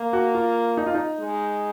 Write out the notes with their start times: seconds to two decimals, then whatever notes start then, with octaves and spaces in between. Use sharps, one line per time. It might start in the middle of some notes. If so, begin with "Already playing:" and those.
Already playing: A#3
0.13 F#4
0.35 F4
0.77 D#4
0.86 F4
0.94 D#4
1.20 G#3